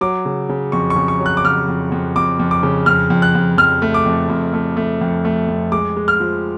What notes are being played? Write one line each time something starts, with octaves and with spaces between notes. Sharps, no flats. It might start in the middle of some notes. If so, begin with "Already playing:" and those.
F#3 D6
C#3
C#3
F2 C#6
C#6
C#3
C#6
F#3
F#6
D6
C#3 F6
F2
F2
F2 D6
F2
D6
C#3
F2 F6
F2
F#6
F2
F2 F6
A3
D6
F2
F2
A3
A3
F2
A3
F2
G#3 D6
G#3
F6
F3